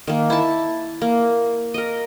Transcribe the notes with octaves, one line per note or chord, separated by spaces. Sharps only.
D#3 A#3
E4 A5
A#3
A#4 D#5